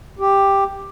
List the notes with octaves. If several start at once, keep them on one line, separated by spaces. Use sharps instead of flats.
G4